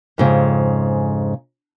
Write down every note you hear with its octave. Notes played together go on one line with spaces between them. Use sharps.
F2 G#2 C#3